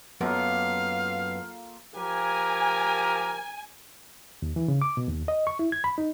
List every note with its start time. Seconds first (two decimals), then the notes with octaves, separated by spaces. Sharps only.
0.21 F#2 A#3 B3 F4 A4 D5 F5
1.96 F3 G4 A#4 G#5
4.42 D#2
4.56 E3
4.68 C#3
4.82 D6
4.97 B2
5.08 D#2
5.28 D#5
5.47 C#6
5.59 E4
5.72 G#6
5.84 B5
5.98 D#4